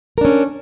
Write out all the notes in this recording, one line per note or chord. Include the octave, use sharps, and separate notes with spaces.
C#4 D4 A#4